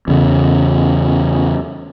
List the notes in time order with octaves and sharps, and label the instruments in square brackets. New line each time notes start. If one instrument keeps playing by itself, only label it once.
[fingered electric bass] E2 C#3